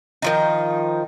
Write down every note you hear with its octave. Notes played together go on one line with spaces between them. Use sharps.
D#3 F3 D#4